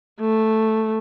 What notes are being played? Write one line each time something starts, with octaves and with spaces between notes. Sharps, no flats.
A3